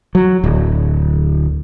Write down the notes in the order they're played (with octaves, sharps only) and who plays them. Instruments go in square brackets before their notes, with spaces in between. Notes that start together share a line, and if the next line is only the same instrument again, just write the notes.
[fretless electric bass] F#3
D1